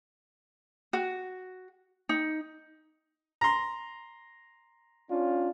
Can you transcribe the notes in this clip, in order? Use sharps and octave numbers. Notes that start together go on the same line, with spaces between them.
F#4
D#4
A#5 C6
C#4 D4 F4